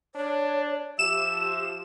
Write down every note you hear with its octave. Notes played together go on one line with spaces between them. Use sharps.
D4 C#5
F3 G4 E5 E7